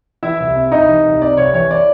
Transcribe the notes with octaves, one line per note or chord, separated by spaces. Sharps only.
E3 E4 E5
C2
C3
C2 D#4 D#5
E3
C2
C3 D5
C2 C#5
E3 C#5
D5